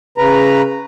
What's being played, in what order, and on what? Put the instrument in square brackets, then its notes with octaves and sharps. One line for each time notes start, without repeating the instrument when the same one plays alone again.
[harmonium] C#3 B4 A#5